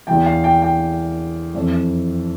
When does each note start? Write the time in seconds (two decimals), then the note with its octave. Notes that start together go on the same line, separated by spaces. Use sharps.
0.07 E2 E3 G5
0.26 F5
0.44 G5
0.62 G5
1.54 F2 E3